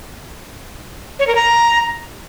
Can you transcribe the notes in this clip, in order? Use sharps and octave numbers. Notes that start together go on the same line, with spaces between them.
C#5
A#4
A#5